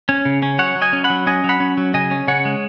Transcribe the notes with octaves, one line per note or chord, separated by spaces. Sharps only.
C#4
C#3
C#4
F#3 C#5 F#5
F#3
D#5 G#5
C#4
F#5 B5
F#3
C#4 D#5 G#5
F#3
F#5 B5
C#4
F#3
C#3 D#5 G#5
C#4
C#3 C#5 F#5
G#3